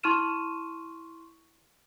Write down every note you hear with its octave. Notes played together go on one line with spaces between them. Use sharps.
E4 C6 C#6 F6 D#7 E7